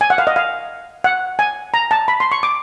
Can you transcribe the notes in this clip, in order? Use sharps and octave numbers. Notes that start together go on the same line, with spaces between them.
G#5
F#5
F5
D#5
F5
F#5
G#5
A#5
A5
B5
C6
C#6
D6